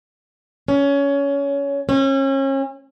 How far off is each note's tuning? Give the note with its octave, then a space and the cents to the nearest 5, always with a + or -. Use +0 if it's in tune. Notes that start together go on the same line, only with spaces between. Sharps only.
C#4 +20
C#4 -35